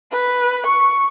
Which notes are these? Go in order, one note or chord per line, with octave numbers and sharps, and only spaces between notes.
B4
C#6